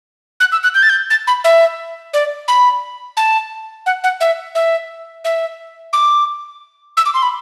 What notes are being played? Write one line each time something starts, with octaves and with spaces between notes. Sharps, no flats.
F#6
E6
F#6
G6
A6
G6
A6
B5
E5
D5
B5
A5
F#5
F#5
E5
E5
E5
D6
E6
D6
C6
B5